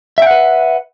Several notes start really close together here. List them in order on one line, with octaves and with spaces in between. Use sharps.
E5 G5 F#5 B4